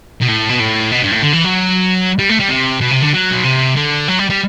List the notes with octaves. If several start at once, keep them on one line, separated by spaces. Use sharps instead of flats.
B2
A2
B2
A2
B2
G2
A2
D3
E3
F#3
G3
A3
G3
C3
B2
C3
D3
F#3
B2
C3
D3
F#3
G3
G3